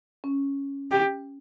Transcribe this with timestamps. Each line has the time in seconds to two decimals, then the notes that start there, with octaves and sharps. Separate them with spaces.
0.24 C#4
0.91 G4